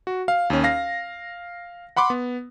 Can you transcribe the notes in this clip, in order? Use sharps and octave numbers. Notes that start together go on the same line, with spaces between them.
F#4
F5
D#2 C#4
F5 A#6
F#5 B5 C6 D6
B3